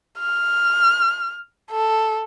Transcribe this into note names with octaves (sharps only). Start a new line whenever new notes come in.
F6
A4